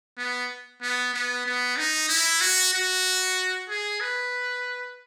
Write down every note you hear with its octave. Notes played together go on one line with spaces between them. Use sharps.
B3
B3
B3
B3
D#4
E4
F#4
F#4
G#4
B4